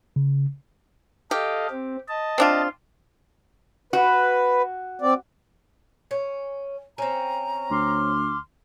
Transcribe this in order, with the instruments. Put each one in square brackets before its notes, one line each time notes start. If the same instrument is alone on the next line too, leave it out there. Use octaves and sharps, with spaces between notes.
[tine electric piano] C#3
[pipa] G4 [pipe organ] A4 D#5 F5
[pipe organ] C4
D#5 A5
[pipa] C4 D4 F4
[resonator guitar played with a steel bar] F#4 [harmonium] B4
[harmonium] C4 D5
[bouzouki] C#4
[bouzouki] C4 C#4 [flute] A#5
[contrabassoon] D2 [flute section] C6 D6 F6